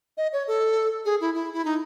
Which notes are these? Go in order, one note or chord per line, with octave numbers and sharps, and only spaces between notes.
D#5
C#5
A4
G#4
E4
E4
E4
D#4